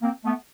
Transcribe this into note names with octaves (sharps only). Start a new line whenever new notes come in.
A#3 C4
A3 B3